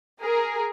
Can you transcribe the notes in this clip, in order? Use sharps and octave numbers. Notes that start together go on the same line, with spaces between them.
G#4 A#4